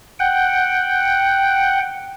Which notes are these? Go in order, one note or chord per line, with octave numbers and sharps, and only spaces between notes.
F#5 G5